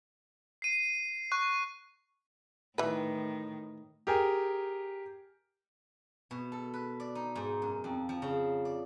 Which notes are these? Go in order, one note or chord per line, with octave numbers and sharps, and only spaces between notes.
C7 D#7
C#6 F#6 D#7
A2 D#3 E3 B4
G4 G#4 A#4 G#5
B2
A4
B4
D5
D#4
G#2
F#2
F2
F3
C#3
D5